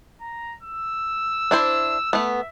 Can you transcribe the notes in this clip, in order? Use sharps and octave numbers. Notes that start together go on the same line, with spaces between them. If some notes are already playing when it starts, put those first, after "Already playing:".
A#5
E6
D4 E4 C5
A3 B3 E5